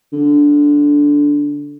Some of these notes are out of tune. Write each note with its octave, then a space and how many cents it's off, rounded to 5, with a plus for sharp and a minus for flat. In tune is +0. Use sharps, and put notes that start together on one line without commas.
D3 -10